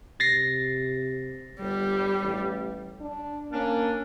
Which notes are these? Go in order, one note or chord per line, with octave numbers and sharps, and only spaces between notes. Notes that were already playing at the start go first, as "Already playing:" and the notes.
C3 A6 A#6 C7
G1 G3
A1
D4
A#3 C#4 D4